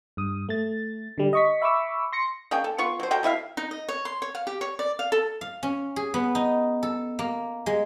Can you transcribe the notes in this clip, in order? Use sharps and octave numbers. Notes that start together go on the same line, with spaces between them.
G2 D#6
A3 A6
D3 G3
D#5 C#6 B6
E5 B5 C#6 D6 E6
C6 A#6 C#7
A#3 C#4 G#4 G5
A4
B3 F4 C#6
F#3 C5
F#4 A4 G5 A#5
B2 E4 E5 F5
D#4
D#5
C#5
C6
C#5
F5
G4
C#5
D5
F5
A4
F5
C#4
G#4
B3
D#4
A4
A#3
G#3